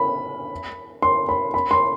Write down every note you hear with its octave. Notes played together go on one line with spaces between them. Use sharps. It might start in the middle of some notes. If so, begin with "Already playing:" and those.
Already playing: B5
C6
B5
B5
C6